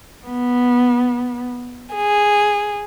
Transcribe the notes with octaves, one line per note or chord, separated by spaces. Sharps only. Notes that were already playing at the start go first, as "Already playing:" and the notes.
B3
G#4